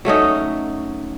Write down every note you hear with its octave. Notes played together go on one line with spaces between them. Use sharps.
F#3 A3 C#4 D#4